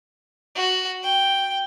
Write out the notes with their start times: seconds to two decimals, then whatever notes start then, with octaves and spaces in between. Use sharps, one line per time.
0.55 F#4
1.03 G5